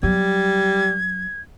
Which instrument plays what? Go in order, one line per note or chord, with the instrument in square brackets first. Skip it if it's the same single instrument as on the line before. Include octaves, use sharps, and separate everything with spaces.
[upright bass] F#3 [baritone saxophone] G3 [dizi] G#6